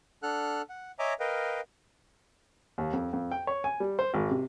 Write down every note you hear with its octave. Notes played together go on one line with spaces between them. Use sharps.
D4 A4 F#5 F6 F#6
F#5
C#5 D#5 E5 G#5 A#5 D6
A#4 B4 D#5 F5 G5
D#2
F2
F2
G5
C#5
G#5
G3
C5
G#1
C3